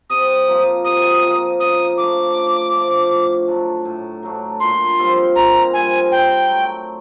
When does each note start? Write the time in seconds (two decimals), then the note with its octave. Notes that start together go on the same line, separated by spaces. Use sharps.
0.10 C3 D#6
0.48 F3 A#3
0.85 C3 D#6
1.22 F3 A#3
1.60 C#3 D#6
1.97 F3 A3 D4 D6
2.35 C#3
2.73 F3 A3 D4
3.10 A2
3.48 F#3 A3 D4
3.85 A2
4.23 F#3 A3 D4
4.60 A#2 C6
4.98 G3 C4 F4
5.36 A#2 A#5
5.73 G3 C4 F4 G#5
6.10 D#3 G5
6.48 F#3 A3